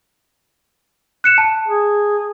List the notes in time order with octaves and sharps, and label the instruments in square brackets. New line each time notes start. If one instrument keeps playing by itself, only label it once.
[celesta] F#6 C#7 E7
A5
[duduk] G#4